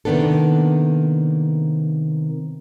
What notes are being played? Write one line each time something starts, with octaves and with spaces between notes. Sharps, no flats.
C3 D#3 A#3 B3 D4 A4